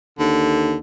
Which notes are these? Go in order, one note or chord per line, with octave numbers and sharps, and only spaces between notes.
D#2 D3